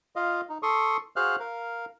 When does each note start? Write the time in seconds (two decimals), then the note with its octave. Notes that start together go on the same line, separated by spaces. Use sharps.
0.16 F4 D#5 F5
0.49 D#4
0.63 A4 C6 C#6 D#6
1.16 F#4 G#4 C5 F5 F6 F#6
1.40 A#4 F5